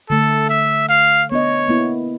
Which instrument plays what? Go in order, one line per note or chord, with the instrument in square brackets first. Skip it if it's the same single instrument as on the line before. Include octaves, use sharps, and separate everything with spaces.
[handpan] D3 A3 [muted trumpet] A4
[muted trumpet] E5
F5
[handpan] B3 D4 D#5 [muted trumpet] C#5
[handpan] A#3 B3 E4